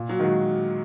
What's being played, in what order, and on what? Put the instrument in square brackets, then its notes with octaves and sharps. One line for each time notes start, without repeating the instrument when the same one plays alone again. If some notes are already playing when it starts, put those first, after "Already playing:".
Already playing: [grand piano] A#2
[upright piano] F#3
[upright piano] D#3 [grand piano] G#3 F#4